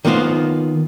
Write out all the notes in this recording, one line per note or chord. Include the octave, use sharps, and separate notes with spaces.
D#3 A#3 B3 F4 C5